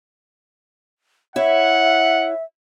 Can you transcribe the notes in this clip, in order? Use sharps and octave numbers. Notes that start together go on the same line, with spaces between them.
E4 C#5 E5 F#5